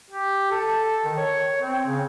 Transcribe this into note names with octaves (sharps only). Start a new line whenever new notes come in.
G4
A4
D#3
C#5
C4
C#3